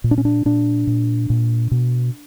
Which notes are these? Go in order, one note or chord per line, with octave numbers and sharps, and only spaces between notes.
A#2
D4
C#4
D4
A#2 D4
A#2
A#2
B2